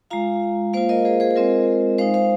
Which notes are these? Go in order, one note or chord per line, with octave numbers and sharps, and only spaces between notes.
G#3 F4 F5 A#5
A#3 F4 C5 F5
A#4 D#5
G#4 C5
G#4 C5
C5
G#3 C4 F4 A#4 D#5
G#3 D#4 C5 F5
C5 F5